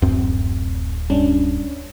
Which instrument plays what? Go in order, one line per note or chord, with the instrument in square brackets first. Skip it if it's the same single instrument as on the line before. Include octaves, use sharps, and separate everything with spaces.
[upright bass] D1 [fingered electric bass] F#2 C4
[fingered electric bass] G2 [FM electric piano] C#4 D4